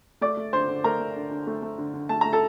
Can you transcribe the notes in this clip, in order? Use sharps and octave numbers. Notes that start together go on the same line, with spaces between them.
A3 D5 D6
A3
D3 C5 C6
D3
A3 A#4 A#5
A3
D3
D3
A3
A3
D3
D3
A3 A5
A3 A#5
A4 A5